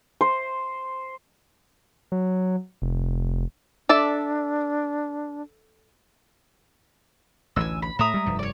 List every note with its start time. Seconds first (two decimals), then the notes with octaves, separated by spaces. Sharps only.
0.21 C5
2.12 F#3
2.82 F1
3.89 D4 A4 D5 E5
7.56 A1 D2 E3 G#5 E6
7.82 B5
7.99 A2 E5 A#5 D#6
8.14 G3 G#3
8.26 F1 G2 F3
8.39 C#5 D5